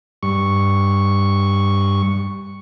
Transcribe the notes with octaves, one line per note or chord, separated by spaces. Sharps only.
G2 C#6